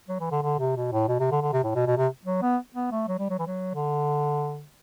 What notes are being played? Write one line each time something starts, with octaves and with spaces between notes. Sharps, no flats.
F#3
E3
D3
D3
C3
B2
A2
B2
C3
D3
D3
C3
A2
B2
B2
C3
F#3
B3
B3
A3
F#3
G3
F#3
E3
F#3
D3